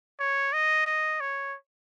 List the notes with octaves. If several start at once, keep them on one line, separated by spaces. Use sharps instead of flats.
C#5
D#5
D#5
C#5